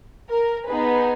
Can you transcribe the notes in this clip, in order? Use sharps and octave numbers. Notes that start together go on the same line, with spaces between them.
A#4
B3 D#4 G#4 B4